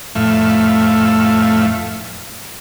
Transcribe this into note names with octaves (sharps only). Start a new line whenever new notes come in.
F2 A2 A3 E5 F5